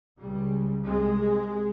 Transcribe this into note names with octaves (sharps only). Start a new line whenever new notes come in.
C#2 C#3 G3
C2 C3 G#3